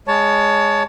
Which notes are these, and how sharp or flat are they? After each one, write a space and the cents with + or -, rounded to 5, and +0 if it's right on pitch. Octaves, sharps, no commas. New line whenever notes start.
G#3 +0 C#5 +20 A5 +0